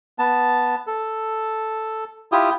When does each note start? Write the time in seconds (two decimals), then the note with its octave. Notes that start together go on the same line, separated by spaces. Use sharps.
0.19 B3 A5
0.87 A4
2.32 E4 F4 G4 D#6